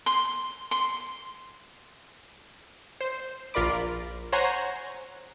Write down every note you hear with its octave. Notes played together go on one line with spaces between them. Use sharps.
C6
C6
C5
A#1 F4 A#4 D5 B5 D6
C5 C#5 F#5 G#5 A#5